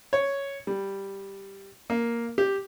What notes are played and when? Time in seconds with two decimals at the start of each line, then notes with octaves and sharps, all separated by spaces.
0.13 C#5
0.67 G3
1.90 A#3
2.38 G4